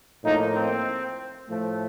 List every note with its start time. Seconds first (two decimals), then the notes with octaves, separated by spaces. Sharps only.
0.24 A2 F3 A#3 D#4
0.55 C4
1.49 A2 F3 A3